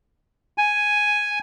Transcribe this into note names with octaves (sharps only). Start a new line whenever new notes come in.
G#5